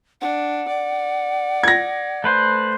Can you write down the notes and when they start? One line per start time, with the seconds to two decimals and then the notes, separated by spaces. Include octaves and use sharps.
0.21 D4 F#5
0.68 D5
1.63 G#6 A#6
2.24 A3 B4 C5